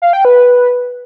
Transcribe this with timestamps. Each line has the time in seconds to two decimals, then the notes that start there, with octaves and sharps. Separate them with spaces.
0.02 F5
0.13 G5
0.25 B4